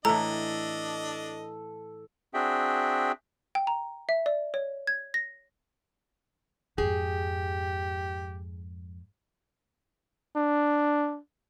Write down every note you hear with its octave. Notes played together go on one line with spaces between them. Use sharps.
A2 E3 D4 A4 D#5 A#5
C4 D4 F#4 G#4 E5 G5
G5
A#5
E5
D5
C#5
G#6
A#6
F2 G#2 G4 G#4
D4